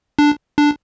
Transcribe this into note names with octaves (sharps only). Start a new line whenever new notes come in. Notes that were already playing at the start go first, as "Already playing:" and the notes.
D4
D4